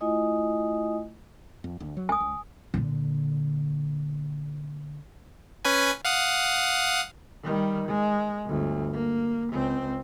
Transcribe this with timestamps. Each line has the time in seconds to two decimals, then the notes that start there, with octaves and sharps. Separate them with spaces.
0.01 A3 E4 F4 D#5 G#5 D#6
1.64 F2
1.80 D2
1.97 F#3
2.09 C#2 G#5 D#6
2.20 C#2
2.74 A#2 D3
5.65 C#4 B4 G#5
6.05 F5 F#5 D#6
7.43 D#3 G3
7.88 G#3
8.45 G1 D2
8.93 A#3
9.52 C#2 C4